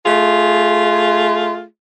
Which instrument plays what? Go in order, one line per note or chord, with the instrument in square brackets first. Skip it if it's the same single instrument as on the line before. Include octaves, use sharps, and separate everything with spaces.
[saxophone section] A3 F4 G#4